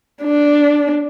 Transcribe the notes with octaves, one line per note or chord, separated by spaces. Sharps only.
D4